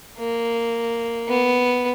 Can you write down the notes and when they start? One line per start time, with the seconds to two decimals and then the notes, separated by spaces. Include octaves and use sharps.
0.18 A#3
1.28 B3